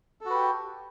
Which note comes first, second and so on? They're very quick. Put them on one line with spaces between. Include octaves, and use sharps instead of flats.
A4 F#4 B4 G4